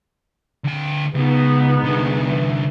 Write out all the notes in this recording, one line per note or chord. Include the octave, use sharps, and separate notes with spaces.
D2 G5
C#2 G#3 B3 D#4
C2 D3
E3